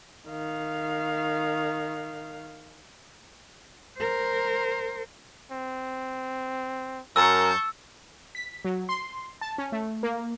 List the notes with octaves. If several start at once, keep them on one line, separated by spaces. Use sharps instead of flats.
D#3 F5
A#4 C5
C4
F#2 A#4 A5 C#6 E6 G6
B6
F#3
C6
A5
C#4
A3
A#3